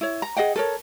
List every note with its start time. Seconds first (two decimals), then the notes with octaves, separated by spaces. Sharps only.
0.01 E4 C#5
0.22 A#5
0.36 G#4 D#5 F#5 G5
0.56 A4 A#4 C#5